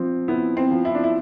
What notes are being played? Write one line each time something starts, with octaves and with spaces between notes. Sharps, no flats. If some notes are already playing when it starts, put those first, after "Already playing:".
Already playing: F3 C4
B3 E4
C4
F3
E4
D4
E4